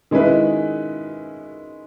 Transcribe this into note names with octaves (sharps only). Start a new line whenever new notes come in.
D#3 G#3 C#4 E4 B4